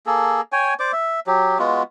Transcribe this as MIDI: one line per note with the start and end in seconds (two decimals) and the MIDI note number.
0.06 0.41 58
0.06 0.41 68
0.06 0.41 69
0.52 0.74 73
0.52 0.74 79
0.52 0.74 80
0.79 0.92 72
0.79 0.92 74
0.79 0.92 86
0.93 1.20 76
1.27 1.58 54
1.27 1.58 67
1.59 1.83 56
1.59 1.83 59
1.59 1.83 65
1.59 1.83 66